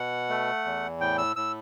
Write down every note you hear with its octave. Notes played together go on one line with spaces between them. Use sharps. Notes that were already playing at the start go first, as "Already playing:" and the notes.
Already playing: B2 F#5
A3
E2
A2 G5
E6
A2 E6